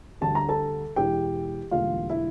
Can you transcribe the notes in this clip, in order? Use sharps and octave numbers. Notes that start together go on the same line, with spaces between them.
D2 D3 G3 A5
A#5
A4 A5
E1 E2 E3 G4 G5
E1 E2 D3 G3 A#3 F4 F5
E4 E5